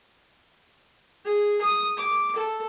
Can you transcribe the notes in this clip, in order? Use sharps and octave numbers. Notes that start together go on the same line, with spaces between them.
G#4
D#6
D6
A4